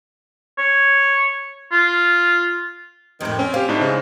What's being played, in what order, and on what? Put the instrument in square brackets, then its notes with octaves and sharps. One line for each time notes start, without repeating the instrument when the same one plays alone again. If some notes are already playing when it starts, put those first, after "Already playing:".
[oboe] C#5
F4
[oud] F2 A2 [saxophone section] C3 D#3
[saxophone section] C4 [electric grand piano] C#4
[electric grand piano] G4 F5 [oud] C5
[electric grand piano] A2 D4 D#4
[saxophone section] G#2 [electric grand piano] C#3